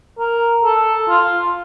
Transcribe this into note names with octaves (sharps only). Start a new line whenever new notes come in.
A#4
A4
F4